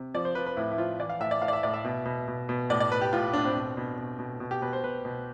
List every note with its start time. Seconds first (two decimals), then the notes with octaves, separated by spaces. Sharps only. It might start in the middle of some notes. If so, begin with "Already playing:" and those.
Already playing: C3
0.14 F3 D5
0.25 C5
0.35 F3 B4
0.47 B4
0.57 A2 E4
0.71 E4
0.78 F3 F4
0.99 E3 D5
1.09 F5
1.20 A2 E5
1.31 D5
1.42 A2 F5
1.48 D5
1.53 E5
1.63 A2 D5
1.74 E5
1.85 B2
2.05 B2
2.28 B2
2.49 B2
2.70 A2 D5
2.80 D5
2.91 A2 B4
3.01 G4
3.13 A2 F4
3.33 A2 D4
3.45 C4
3.55 B2
3.77 B2
3.98 B2
4.19 B2
4.40 B2
4.51 G4
4.62 B2 B4
4.73 C5
4.83 B2 B4
5.05 B2